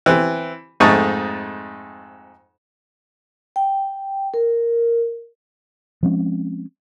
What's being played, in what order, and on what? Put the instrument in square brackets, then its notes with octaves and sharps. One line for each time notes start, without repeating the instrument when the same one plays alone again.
[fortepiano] E3 C4
F2 G#2 A3 D#4 A5 C#6
[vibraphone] G5
A#4
[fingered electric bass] F3 G#3 C4 C#4